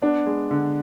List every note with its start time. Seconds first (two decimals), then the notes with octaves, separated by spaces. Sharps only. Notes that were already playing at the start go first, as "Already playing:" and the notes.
0.02 B3 D4
0.26 G#3
0.51 D3